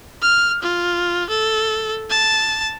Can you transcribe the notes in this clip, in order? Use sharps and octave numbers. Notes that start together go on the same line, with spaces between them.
F6
F4
A4
A5